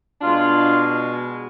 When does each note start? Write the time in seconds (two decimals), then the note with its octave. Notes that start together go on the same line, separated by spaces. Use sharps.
0.21 B2 G#3 D4 F4